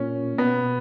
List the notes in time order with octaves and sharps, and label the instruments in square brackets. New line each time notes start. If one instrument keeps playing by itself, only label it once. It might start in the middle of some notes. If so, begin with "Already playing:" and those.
Already playing: [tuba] A#2 [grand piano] C#4
[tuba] B2 [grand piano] B3